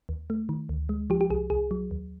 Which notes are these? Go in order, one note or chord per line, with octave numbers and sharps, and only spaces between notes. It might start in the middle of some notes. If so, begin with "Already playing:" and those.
D#2
A3
D#3
D2
G#3
F3 G4
G4
C2 G#4
C2 G#4
F#3
D#2